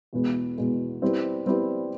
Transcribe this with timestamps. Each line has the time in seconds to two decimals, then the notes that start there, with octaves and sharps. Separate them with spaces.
0.13 E2 B2 G#3 B3
0.58 E2 B2 G#3 B3
1.02 G3 C4 E4 G4 B4
1.46 G3 C4 E4 G4 B4